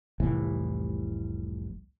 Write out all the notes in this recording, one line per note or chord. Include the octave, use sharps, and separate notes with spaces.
F1 C2 A2 E3